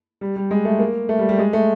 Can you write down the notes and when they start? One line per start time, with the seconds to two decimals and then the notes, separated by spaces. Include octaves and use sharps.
0.21 G3
0.36 G3
0.51 G#3
0.65 A3
0.79 A#3
1.09 A3
1.19 G3
1.29 G3
1.38 G#3
1.53 A3